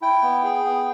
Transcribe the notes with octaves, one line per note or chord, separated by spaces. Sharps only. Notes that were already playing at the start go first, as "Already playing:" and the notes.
E4 G5
B3
G#4
B3